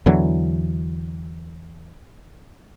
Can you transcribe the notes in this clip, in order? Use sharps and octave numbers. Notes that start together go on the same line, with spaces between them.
E2 D3 E3 F#3